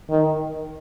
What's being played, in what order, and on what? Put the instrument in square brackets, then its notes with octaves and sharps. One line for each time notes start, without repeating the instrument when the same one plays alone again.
[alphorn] D#3